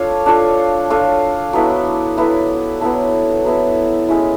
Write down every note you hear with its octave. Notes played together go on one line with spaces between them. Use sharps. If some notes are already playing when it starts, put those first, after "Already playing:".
Already playing: D4 F4 A4 C#5
D4 F4 A4 C#5
D4 F4 A4 C#5
F#3 B3 E4 A4
F#3 B3 E4 A4
F#3 B3 E4 A4
F#3 B3 E4 A4
G#3 C#4 E4